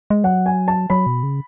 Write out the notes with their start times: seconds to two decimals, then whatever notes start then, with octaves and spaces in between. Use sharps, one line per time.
0.10 G#3
0.24 F#3 F#5
0.46 G#5
0.68 A5
0.90 F#3 B5
1.06 B2
1.23 C#3